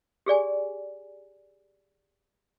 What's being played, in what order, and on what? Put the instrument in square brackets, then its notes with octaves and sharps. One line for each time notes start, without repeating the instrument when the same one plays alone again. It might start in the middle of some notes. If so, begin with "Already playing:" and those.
[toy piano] G4 G#4 D5 G#5